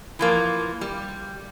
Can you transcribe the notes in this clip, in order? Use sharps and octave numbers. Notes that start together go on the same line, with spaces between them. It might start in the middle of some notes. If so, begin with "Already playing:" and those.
E3 F3 A#3
G3